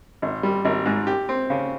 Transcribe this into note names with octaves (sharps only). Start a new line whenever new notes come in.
G#1
G3
G#1
G#2
G4
C4
C#3